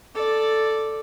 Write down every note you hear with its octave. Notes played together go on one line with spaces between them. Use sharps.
A4 D5